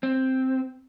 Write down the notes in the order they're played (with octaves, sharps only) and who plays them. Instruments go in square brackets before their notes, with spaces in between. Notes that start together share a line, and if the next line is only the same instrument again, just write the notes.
[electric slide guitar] C4